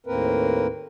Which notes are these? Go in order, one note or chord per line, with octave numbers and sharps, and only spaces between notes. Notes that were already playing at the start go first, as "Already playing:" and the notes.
D#2 A2 A#3 C4 A#4 B4